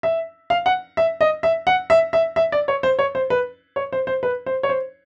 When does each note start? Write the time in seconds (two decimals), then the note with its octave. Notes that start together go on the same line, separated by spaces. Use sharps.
0.03 E5
0.50 F5
0.66 F#5
0.97 E5
1.21 D#5
1.43 E5
1.67 F#5
1.90 E5
2.13 E5
2.36 E5
2.52 D5
2.68 C#5
2.83 C5
2.99 C#5
3.15 C5
3.30 B4
3.76 C#5
3.92 C5
4.07 C5
4.23 B4
4.46 C5
4.63 C#5
4.69 C5